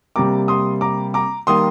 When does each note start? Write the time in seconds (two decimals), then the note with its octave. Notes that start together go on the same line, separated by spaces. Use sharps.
0.16 C3 G3 A#3 A#5 D6
0.48 C6 D#6
0.81 A#5 D6
1.14 A#5 D6
1.47 D#3 G3 A#3 C6 D#6